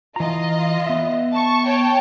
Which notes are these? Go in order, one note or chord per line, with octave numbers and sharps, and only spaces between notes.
E3 F4 D#5 A#5
B3 E5
A5 C#6
C#5 G5 A5